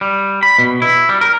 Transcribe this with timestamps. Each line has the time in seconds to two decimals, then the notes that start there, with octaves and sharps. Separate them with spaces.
0.01 G3
0.43 B5
0.58 B2
0.82 E4
1.09 G3
1.21 A#4